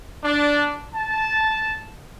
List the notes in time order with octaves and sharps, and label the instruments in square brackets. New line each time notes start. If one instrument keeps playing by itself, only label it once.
[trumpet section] D4
A5